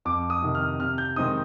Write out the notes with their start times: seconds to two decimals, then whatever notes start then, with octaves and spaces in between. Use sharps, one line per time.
0.05 F2 D6
0.30 D#6
0.42 C3 D#3
0.55 F6
0.80 C3 F6
0.98 G6
1.16 D#3 G#3 C4 D#4 D#6